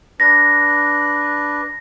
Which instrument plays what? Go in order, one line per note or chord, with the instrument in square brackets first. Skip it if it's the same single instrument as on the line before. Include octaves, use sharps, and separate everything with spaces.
[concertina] D4 B4 [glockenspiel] A#6